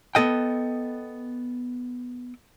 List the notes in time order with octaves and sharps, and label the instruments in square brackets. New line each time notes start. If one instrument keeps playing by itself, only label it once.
[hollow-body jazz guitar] B3 A4 D#5 G5